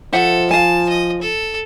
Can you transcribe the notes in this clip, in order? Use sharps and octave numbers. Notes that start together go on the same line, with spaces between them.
F3 A4 C5 E5 F#5
F5 G#5 A5
D#5
A4